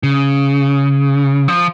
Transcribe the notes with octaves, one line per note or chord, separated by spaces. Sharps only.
C#3
F3